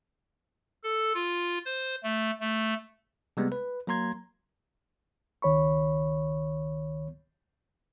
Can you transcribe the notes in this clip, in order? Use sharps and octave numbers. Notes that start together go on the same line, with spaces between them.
A4
F4
C5
A3
A3
C3 G3 G#3 B3
B4
F#3 A#3 A#5 C6 G#6
C#2 D#3 C#5 B5 C#6